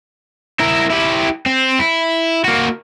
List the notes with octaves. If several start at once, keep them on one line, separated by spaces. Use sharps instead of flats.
E4 A#4
E4 G4
C4
E4
A#3 F#4